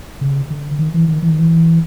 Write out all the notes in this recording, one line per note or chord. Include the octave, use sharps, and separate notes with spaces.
C#3
D3
D#3
E3
D#3
E3
D#3
E3